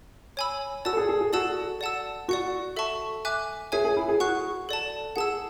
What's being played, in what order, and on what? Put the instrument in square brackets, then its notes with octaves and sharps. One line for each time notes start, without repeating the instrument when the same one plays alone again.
[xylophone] C#5 G#5 B5 E6
[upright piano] F#4 [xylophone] D5 A5 E6
[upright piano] A4
G#4
G#4
G#4
[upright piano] F#4 [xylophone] A4 D5 A5 E6
[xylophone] D5 F#5 A5 E6
[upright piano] F#4 [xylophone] D5 F#5 C#6
[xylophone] A4 E5 A5 C#6
E5 G#5 D6 F#6
[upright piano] G#4 [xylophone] C#5 E5 G#5
[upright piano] G#4
E4
G#4
[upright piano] F#4 [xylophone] F#5 C#6 F#6
[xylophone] A4 D5 A5
[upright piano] G#4 [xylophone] F#5 A5 E6